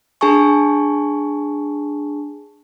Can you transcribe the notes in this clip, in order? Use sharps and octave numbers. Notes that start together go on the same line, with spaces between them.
D4 G#4 G#5 A5 C#6